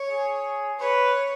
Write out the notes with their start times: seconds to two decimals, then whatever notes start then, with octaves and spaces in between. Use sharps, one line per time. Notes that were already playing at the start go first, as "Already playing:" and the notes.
Already playing: C#5
0.09 G#4
0.79 B4 C#5